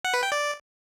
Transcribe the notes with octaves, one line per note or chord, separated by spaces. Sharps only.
F#5
B4
G5
D5